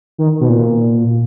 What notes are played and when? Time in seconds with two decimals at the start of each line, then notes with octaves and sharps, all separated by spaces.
0.18 D#3
0.40 B2
0.49 A#2